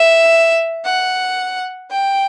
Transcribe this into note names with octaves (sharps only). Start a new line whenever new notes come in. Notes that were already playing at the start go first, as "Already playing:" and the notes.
Already playing: E5
F#5
G5